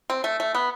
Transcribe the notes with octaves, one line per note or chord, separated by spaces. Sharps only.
C4
A3
A3
B3